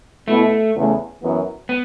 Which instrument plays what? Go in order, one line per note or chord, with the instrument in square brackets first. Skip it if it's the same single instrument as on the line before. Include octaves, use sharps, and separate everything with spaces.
[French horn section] B2 B3 E4 [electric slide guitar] A3
[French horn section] E2 C#3 A3
F#2 E3 B3
[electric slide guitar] B3